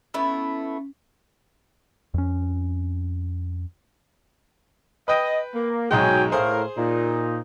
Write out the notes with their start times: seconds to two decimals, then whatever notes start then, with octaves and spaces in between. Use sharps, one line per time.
0.14 A3 B3 C#4 E4
2.14 F2 C#4
5.08 B4 D#5 G5
5.55 A#3
5.91 B1 G#2 F#3 G#3 G5 G#5
6.32 A2 G#4 A#4 C5 F5
6.78 A#2 D#4